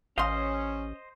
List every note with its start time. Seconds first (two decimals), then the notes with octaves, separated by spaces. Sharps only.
0.18 A1 C#4 C5 D#5 F5 C6